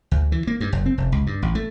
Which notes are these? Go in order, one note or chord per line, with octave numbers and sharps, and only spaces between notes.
D2
E3
A#3
G2
F#1
C4
F1
C#2
G2
A1
A3